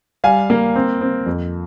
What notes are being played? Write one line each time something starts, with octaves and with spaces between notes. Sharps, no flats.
G3 F5 G#5
A#3
C4
C4
F2